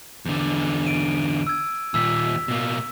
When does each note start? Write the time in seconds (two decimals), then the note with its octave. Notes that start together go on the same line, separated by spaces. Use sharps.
0.25 E2 D3
0.87 D7 D#7
1.47 E6 G#6
1.94 D#2 A#2 E6 B6
2.48 B2 A#3